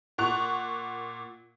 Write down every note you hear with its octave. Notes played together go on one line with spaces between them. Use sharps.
A#2 F#5 C#6 F#6 F7